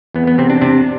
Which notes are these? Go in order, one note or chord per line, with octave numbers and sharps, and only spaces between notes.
E2 B3
B3
C3 C4
D4
C3 D4